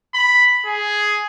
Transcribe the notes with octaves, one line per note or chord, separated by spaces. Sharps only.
B5
G#4